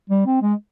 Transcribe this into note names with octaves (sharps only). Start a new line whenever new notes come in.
G3
C4
G#3